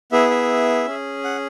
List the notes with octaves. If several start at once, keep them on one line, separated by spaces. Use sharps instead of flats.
B3 E4 G#4 E5
E5
C#4 G#4
F#5